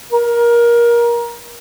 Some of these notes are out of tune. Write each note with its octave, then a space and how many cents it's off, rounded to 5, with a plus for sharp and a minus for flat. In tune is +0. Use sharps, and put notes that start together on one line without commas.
A#4 +20